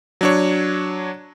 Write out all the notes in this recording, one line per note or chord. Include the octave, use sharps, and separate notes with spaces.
F#3 D4 C#5